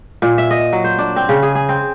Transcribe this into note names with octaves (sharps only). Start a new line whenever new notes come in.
A#2
E5
D#5
F#3
C5
D4
C4
C#3
G#4
G#4
C4